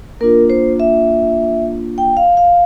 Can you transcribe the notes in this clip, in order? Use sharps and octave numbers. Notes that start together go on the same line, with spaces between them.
A#3 D4 F4 A#4
C5
E5
G5
F5
F5